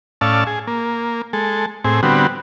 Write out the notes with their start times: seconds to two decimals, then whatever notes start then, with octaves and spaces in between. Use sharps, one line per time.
0.21 A2 C#4 D5 F5 A5 E6
0.47 G#4
0.67 A#3
1.33 G#3 A4
1.85 A2 C4 G#4
2.03 D3 G3 B3 C4 F#4